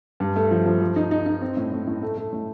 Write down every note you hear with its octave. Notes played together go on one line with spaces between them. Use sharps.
G2
A3
F3
F3
F3
D#4
D#4
D#4
C4
A2
A2
A2
A3
A3
A2